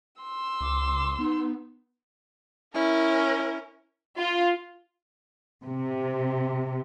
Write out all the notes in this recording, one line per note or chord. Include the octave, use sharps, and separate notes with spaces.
C6 E6
C#2 D6
B3 D#4
C#4 E4 A#4
F4
C3